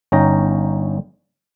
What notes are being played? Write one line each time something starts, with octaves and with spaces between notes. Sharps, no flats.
G1 C#4 D#4 G5 A#5